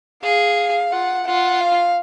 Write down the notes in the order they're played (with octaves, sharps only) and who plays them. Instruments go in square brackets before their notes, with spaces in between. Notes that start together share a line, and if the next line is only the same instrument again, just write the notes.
[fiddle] G#4 [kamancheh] F5
[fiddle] F4 [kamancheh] F#5
[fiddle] F4 [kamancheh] F#5
[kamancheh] F5